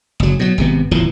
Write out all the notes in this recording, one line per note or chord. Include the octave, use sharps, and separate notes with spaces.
F#1 F#3
B2 F#3
G#1 C3 B3
D1 E2 E3 F3